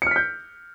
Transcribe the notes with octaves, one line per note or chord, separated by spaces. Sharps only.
F6 G6 B6 C#7